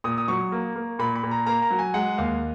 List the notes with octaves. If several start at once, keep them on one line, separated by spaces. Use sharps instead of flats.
A#2 D#6
D#6
F#3 C#6
A#3
A#3
A#2 B5
B5
A#2
A#5
A#3 A#5
A#5
F#3
G#5
G#3 F#5
D#2 F5